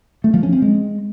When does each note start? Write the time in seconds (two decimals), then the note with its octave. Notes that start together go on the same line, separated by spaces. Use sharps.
0.24 A3
0.34 F3
0.43 C#4
0.53 C4
0.62 G#3